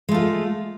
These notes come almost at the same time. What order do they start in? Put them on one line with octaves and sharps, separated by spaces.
G#3 A3 F4